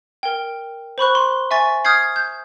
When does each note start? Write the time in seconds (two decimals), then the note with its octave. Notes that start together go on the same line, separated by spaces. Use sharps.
0.23 A#4 G5
0.98 C5 B5 C#6 F#6
1.15 C6
1.51 E5 G#5 C#6 A6
1.85 D#6 F6 G6 G#6 C7
2.16 G6